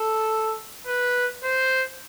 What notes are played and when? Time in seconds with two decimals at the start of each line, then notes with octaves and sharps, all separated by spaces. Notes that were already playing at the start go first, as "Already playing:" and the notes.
Already playing: A4
0.87 B4
1.43 C5